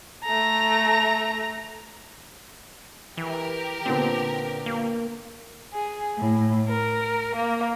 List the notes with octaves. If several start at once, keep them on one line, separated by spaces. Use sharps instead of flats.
A3 A#5
E3 G4 A#4
A#2 D3 B3 C4
A#3
G#4
A2
A#4
A#3